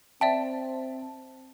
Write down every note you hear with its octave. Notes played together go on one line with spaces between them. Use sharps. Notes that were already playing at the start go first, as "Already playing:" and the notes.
C4 D5 E5 G5 A5